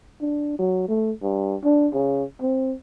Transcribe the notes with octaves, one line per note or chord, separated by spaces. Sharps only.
D4
F#3
A3
G2
D4
C#3
C4